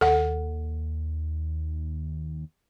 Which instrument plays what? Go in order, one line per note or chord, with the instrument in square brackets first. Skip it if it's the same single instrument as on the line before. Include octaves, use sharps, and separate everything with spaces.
[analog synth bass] D#2 [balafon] A4 F#5